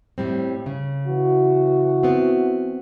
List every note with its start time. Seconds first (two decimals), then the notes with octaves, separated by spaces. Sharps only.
0.18 A2 G3 C4
0.66 C#3
1.06 E3 F#4
2.03 B3 C4